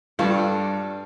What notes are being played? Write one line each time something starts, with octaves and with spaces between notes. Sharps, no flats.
G2 G3 D4 F4 A4 C#6